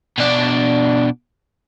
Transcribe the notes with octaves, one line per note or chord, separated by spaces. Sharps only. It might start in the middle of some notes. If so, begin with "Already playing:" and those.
B2 D4